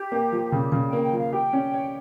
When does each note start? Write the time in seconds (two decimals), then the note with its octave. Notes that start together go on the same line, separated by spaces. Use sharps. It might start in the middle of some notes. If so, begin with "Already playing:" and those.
Already playing: G4
0.12 A#3
0.32 F3
0.52 C#3
0.72 C#3 G#4
0.88 G5
0.93 A#3
1.03 G5
1.13 F3
1.18 F5
1.33 G4 G5
1.53 C#4
1.74 C#5